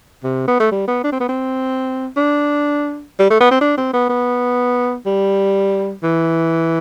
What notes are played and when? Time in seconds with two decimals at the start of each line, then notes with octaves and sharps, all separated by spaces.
0.23 C3
0.48 B3
0.60 A3
0.72 G3
0.87 B3
1.04 D4
1.12 C4
1.20 B3
1.29 C4
2.16 D4
3.19 G3
3.30 A3
3.40 B3
3.51 C4
3.61 D4
3.77 C4
3.93 B3
4.09 B3
5.06 G3
6.03 E3